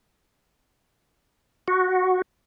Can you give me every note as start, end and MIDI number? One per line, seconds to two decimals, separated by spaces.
1.68 2.22 66